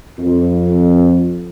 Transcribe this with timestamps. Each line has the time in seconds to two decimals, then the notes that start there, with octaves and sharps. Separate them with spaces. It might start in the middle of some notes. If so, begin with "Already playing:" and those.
0.19 F2